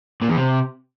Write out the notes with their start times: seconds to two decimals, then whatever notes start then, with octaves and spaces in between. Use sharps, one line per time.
0.21 A#2
0.29 E2
0.36 C3